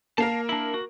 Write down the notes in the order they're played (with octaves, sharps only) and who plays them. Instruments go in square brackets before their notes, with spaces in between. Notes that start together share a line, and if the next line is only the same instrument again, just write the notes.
[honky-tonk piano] A#3 A#4 [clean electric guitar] F5 A5
[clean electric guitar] D4 E4
F#4